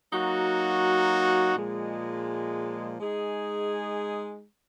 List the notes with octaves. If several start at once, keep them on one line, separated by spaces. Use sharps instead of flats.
F#3 A#3 D#4 F#4
A#2 F3 G#3
G#3 D#4 G#4